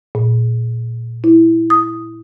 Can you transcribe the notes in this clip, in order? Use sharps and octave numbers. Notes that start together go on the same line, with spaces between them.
A#2
E4
D#6